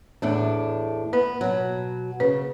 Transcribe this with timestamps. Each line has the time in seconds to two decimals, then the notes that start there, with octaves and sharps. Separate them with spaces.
0.22 E2 A2 D4
1.13 B3 B4
1.41 B2 F#3
2.20 C#3 B4